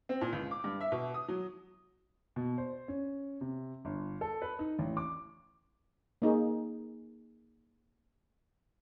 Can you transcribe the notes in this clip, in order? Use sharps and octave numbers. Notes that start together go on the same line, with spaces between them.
C4
A#2
C#2
D6
G2
E5
B2
D#6
F#3
B2
C5
C#4
C3
G1
A4
B4
D#4
A1
D6
A#3 D#4 G#4